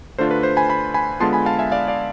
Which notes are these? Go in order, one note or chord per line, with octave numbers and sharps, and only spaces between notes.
D3 A3 D4 F4 C5
B4
C5
G#5 B5
G#5 B5
G#5 B5
D3 G#3 B3 F4 A5 C6
G#5 B5
F5 A5
E5 G#5
D5 F5
D5 F5